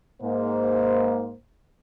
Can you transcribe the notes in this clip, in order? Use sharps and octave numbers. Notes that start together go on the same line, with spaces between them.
G#2 A#3 C5